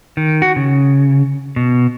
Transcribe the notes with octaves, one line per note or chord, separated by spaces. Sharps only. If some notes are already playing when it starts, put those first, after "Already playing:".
D#3
F#4
C#3
B2